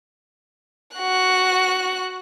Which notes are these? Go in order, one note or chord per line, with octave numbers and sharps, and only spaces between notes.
F#4 F#6